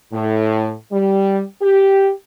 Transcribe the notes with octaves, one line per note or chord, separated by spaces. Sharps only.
A2
G3
G4